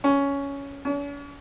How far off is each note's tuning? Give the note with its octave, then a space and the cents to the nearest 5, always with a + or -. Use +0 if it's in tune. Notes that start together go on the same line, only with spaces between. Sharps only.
C#4 +10
C#4 +45